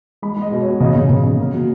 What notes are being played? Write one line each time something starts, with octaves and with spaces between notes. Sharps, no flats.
G#3 B5
G#3
D#5
B2
C#5
B2
C#3 D#5
C#3
C#3
C#3
A#3
F#3